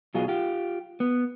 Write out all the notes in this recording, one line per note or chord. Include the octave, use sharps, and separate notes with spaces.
B2 F#3 F4 G#4
F4 G4
B3